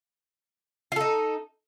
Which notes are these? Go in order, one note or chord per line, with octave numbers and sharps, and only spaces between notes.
D#4 F4 A4